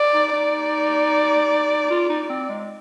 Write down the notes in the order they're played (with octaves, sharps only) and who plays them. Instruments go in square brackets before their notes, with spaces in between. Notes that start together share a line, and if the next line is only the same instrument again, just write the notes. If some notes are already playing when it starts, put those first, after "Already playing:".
Already playing: [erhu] D5
[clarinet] D#4
[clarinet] D#4 [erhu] D5
[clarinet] F4
D#4
C4
G#3